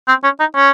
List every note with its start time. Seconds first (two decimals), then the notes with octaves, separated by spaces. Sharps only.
0.08 C4
0.24 C#4
0.40 D#4
0.56 C#4